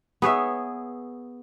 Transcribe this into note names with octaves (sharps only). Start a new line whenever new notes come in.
B3 G#4 C#5 E5